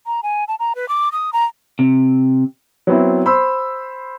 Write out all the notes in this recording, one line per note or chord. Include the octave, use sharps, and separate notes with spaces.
A#5
G#5
A5
A#5
B4
D6
D#6
A#5
C3
F#3 B3 C4 E4
C5 B5 C6 E6